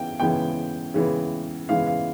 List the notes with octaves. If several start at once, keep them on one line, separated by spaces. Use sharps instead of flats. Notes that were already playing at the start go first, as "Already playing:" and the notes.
Already playing: C#3 E3 B3 G5
C#3 E3 G#3 B3 G5
C#3 E3 G#3 B3
C#3 E3 G#3 B3 F5
F5